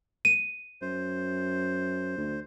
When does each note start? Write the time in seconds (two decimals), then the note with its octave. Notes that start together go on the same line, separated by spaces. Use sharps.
0.25 D#7
0.82 F#2 C5
2.17 D2